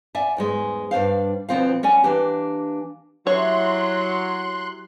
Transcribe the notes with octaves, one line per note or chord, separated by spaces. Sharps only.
D5 E5 F#5 G#5
E2 G#2 G#3
G2 D4 C5 F5
D2 B2 F3 C4 F4 F5
C#4 D5 F#5 G#5
E3 A#3 D4 G4
F#3 E4 G4 C#5 C6 F#6